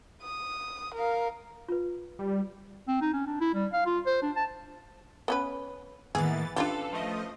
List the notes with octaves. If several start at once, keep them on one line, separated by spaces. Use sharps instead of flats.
D#6
A#4 F5
F4 B4
G3
C4
D#4
C#4
D4
E4
G3
F5
F4
C5
D4
A5
B3 C#4 B4
A2 D#3 E3 A#3 B3 G#4 A6
C#4 D4 F4 G4 A4 B4 F5
F3 A3 D#5